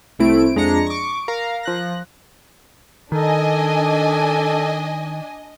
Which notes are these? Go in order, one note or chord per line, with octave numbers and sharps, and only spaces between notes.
C2 A3 C4 E4 D7
F2 G#3 D4 A#5 A#6 C#7
C#6 D6
A#4 F5 A#5
F3 F#6 A#6
D#3 D4 A4 D#5 G#5